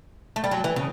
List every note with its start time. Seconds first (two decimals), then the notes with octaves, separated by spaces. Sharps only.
0.36 A3
0.44 G3
0.51 F#3
0.64 E3
0.76 C#3